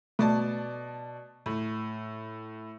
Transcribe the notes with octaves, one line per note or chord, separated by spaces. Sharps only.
B2 A3 D5 A5
A2